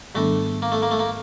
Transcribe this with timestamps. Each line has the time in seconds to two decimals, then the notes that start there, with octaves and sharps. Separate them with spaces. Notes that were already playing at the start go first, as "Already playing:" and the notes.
0.15 G#2 D#3 G3 A3 B3 D4
0.62 A#3
0.72 A3
0.82 A#3
0.91 A3
0.99 A#3